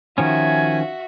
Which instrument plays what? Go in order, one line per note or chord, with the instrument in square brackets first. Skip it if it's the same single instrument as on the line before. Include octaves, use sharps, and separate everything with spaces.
[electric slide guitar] D#3 F3 C#4 [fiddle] F#4 E5 [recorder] G#5